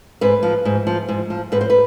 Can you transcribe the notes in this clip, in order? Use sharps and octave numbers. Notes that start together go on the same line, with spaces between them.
G#2 B4
F3
G#2
F3
G#2
F3
G#2 B4
C5
B4